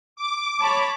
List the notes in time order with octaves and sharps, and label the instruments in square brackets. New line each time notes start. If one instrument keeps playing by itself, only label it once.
[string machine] D6
[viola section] C#5 A5 B5